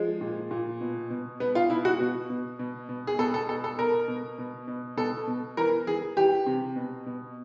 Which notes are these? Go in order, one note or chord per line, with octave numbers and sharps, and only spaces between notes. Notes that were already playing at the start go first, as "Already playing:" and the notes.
Already playing: F3 G#3
A#2
A#2
B2
B2
B2 B3
F4
B2 E4
F#4
B2
B2
B2
B2
G#4
B2 A4
A4
B2 A4
A4
B2 A#4
B2
B2
B2
B2 A4
B2
E3 A#4
E3 G#4
E3 G4
C3
B2
B2